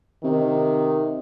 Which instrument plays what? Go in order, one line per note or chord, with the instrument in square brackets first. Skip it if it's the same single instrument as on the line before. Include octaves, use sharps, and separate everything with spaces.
[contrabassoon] C3 [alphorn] D#3